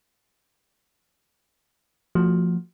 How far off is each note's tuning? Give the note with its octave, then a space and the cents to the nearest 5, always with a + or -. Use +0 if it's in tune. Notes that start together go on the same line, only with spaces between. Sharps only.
F3 +0 A3 +40 F#4 +0